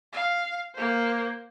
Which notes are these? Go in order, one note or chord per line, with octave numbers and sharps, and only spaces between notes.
F5
A#3 C5